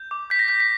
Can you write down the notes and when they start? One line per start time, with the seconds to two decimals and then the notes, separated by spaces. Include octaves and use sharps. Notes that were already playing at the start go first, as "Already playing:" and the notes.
Already playing: G6
0.11 D6
0.30 G6 B6
0.39 A#6
0.48 G6 B6
0.60 B6